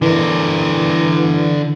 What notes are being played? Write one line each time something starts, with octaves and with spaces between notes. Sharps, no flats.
D3 E3 A#4